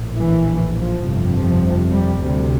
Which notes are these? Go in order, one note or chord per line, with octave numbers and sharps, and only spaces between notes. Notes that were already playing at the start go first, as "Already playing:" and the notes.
Already playing: A#1 A2
E3
F3
G1 F2 C3
F3
G3
D2 C3